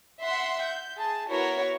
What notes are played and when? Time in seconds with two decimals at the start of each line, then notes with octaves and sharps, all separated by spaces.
0.23 E5 F#5 C6
0.64 G6
0.97 G#4 A5
1.30 B3 E4 F#4 A#4 C#5